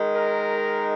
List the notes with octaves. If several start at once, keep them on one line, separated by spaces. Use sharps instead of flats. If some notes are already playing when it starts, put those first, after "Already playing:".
Already playing: D#3 G#3 D#4
A#4